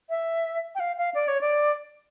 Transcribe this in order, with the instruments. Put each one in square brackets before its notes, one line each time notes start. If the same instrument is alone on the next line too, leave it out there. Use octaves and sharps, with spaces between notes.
[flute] E5
G5
F5
F5
D5
C#5
D5